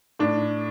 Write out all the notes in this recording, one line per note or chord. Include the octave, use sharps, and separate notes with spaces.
A2 D4